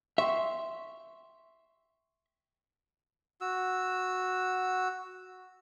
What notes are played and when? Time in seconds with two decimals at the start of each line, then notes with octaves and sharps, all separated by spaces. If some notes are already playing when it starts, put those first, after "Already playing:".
0.18 E5 G5 C6 C#6
3.41 F#4 E6